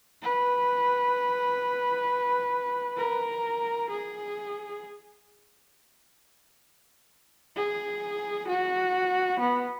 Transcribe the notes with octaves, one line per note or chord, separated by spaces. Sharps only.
B4
A#4
G#4
G#4
F#4
B3